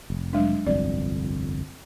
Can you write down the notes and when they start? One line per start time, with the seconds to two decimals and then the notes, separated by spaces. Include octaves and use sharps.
0.10 F1
0.33 F#3 G#3 D4
0.66 G1 C2 F2 D5